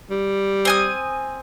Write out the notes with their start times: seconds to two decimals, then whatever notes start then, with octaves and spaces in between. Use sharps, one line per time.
0.10 G3
0.65 C4 G#5 D#6